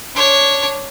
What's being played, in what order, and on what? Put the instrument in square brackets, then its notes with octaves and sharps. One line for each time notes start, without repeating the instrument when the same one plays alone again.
[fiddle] D4 C#5